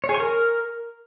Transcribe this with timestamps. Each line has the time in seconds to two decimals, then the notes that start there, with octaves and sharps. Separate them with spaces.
0.04 C#5
0.09 G#4
0.14 C#6
0.20 A#4